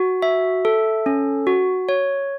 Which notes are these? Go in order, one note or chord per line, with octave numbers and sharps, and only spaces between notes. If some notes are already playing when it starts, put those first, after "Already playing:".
Already playing: F#4
E5
A4
C#4
F#4
C#5